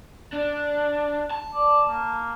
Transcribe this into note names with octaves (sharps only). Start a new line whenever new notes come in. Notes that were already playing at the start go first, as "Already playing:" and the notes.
D4
A5
D5
A#3